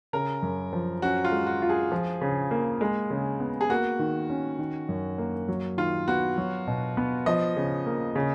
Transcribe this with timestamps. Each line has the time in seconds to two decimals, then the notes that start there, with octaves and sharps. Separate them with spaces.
0.13 C#3 A#4
0.42 F#2
0.73 F3
1.02 C#4 F#4
1.25 F4
1.32 G#3
1.47 F#4
1.62 F4
1.69 G#4
1.92 F3
2.21 C#3
2.51 A#3
2.81 G#3
3.10 C#3
3.40 B3
3.61 G#4
3.70 A#3 F#4
3.99 D#3
4.30 C#4
4.59 D#3
4.89 F#2
5.18 A#3
5.48 F#3
5.77 D#3 F4
6.08 B3 F#4
6.38 F#3
6.67 B2
6.97 B3
7.26 F3 D#5
7.56 C#3
7.86 A#3
8.15 C#3